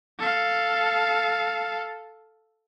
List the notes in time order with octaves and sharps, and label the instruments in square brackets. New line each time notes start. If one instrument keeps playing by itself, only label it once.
[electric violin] A4 F5